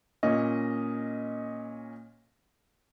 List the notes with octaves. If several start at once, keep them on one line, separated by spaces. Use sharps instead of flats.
A#2 C#4 D#5